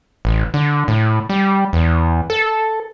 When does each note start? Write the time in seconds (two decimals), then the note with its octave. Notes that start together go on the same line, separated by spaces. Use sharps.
0.25 A1
0.54 D3
0.88 A2
1.30 G3
1.73 E2
2.30 A4